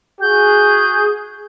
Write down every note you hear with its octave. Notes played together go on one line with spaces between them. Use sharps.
F#4 G#4 G6